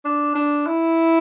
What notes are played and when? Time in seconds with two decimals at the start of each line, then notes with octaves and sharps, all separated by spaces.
0.05 D4
0.35 D4
0.66 E4